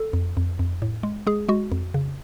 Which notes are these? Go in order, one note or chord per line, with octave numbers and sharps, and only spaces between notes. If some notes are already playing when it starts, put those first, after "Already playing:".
Already playing: A4
F2
F2
F2
A2
G#3
G#3 G#4
G#3 F#4
F2
C#3